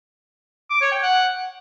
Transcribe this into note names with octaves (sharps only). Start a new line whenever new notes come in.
D6
C#5
G5
F#5